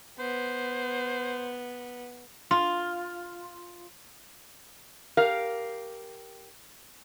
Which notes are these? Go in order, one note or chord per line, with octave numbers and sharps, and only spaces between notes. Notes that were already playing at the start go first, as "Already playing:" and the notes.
B3 C5
F4
G4 A#4 F5